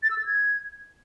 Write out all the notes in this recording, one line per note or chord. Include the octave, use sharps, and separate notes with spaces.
A6
E6
A6
G#6